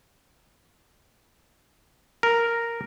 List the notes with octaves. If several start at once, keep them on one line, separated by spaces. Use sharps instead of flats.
A#4